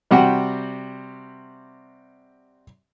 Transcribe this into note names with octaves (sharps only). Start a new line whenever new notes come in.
C3 G3 F#4 F#5 G5